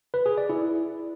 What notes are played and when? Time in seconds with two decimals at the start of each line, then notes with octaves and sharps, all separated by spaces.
0.14 B4
0.26 G#4
0.38 D5
0.49 E4